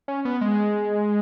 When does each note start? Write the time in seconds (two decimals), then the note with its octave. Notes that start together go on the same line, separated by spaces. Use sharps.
0.08 C#4
0.25 B3
0.41 G#3